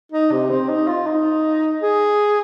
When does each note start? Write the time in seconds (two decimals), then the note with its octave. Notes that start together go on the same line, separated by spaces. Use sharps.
0.12 D#4
0.31 C3
0.50 C4
0.69 D#4
0.87 F4
1.06 D#4
1.82 G#4